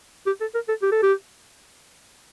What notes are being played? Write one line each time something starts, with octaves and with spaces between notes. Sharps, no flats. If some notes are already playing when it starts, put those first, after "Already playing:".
G4
A4
A#4
A4
G4
A4
G4